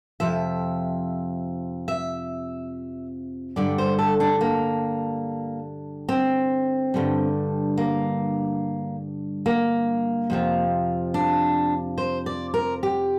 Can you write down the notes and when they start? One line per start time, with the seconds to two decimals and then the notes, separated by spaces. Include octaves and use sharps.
0.20 F2 C3 F3 E5
1.88 E5
3.56 G2 D3 G3 D5
3.78 C5
3.99 A4
4.20 D4
4.41 A#3
6.09 C4
6.94 G2 D3 G3
7.78 A#3
9.46 A#3
10.30 F2 C3 F3
11.14 D4
11.98 C5
12.26 D5
12.54 A#4
12.83 G4